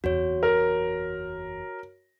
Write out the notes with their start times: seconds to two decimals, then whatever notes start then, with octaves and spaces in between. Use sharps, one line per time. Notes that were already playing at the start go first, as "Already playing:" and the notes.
0.04 F#1 E2 F#4 C#5
0.43 A#4